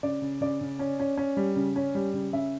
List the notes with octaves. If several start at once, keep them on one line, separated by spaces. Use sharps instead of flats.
C#3 D5
C#3
C#3 D5
C#3
C#4
C#4
C#4
G3
C#3
C#4
G3
C#3
C#3 E5